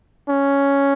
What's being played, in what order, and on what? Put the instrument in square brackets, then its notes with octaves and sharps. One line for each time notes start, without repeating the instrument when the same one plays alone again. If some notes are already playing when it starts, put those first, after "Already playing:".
[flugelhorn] C#4